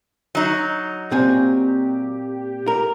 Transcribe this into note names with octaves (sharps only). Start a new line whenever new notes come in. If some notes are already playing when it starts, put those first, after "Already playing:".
F#3 D#4
A#2 C4 G4 G#5
A#4